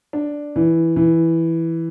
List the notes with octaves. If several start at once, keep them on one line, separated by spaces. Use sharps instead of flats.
D4
E3
E3